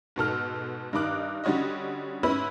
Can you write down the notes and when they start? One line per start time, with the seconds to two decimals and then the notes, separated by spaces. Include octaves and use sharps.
0.16 G#2 B2 A4 F6
0.93 G2 D#3 D#4 D6 F#6
1.44 D3 G3 C#4 F#4 D#5
2.23 G#2 C#4 E4 B4 B5